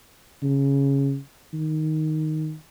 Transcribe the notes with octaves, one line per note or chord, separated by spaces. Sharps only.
C#3
D#3